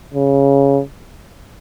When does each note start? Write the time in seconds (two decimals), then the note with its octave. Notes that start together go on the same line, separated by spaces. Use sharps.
0.14 C#3